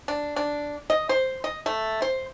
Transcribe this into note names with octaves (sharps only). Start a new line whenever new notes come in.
D4
D4
D#5
C5
D#5
A3
C5